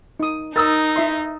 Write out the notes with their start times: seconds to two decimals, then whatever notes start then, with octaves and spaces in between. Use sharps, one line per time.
0.20 D#4 D#6
0.56 D#4 A#4 D#6 E6 A6
0.96 E4 E5 C6